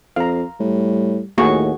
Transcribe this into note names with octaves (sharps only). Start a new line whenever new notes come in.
F2 F5 A#5
A2 G3
D#2 A2 A#3 F#4 G#4 C#6